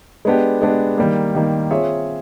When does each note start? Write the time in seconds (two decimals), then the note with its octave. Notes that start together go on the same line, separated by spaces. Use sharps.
0.25 G#3 B3 D4 G4
0.62 G#3 B3 D4 G4
0.98 D#3 G3 A#3
1.35 D#3 G3 A#3
1.71 C4 F4 G#4 C#5 E5